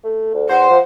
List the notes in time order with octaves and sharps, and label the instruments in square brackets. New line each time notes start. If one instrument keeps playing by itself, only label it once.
[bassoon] A3
D2
[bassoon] E2 [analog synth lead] C5 [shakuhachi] F#5
[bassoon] F3